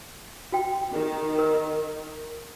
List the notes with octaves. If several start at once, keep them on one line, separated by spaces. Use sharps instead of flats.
F#4 G5
D#3
A#4